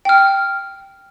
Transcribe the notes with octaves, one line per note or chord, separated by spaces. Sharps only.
G5 F6